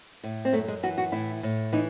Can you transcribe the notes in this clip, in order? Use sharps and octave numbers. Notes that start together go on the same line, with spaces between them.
A2
C4
F#2 A3
G#3
E3 F#4
F#4
A2 E4
A2
E3 D#4